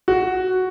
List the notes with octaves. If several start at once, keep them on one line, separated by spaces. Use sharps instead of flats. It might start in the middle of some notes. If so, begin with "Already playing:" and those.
F#4